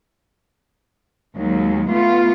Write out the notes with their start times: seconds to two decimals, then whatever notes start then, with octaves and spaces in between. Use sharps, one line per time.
1.37 D#2 F#3 G#3
1.92 A3 B3 F4